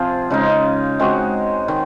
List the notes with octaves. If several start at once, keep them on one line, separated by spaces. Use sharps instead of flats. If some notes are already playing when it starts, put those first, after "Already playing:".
Already playing: C3 F3 C4 F4 G#4
C#3 G#3 D#4
G#3 C4 F#4
D#3